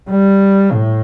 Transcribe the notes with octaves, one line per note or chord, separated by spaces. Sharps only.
G3
A2